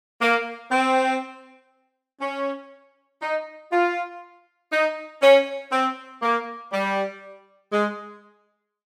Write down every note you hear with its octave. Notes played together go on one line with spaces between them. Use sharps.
A#3
C4
C#4
D#4
F4
D#4
C#4
C4
A#3
G3
G#3